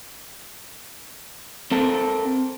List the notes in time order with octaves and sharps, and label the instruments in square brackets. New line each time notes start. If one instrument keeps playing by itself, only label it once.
[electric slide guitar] C4 A4 A#4